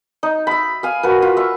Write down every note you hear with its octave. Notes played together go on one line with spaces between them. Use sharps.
D#4
E5 B5
F5 G#5
F#4 A#4 B4
F4
E5 C#6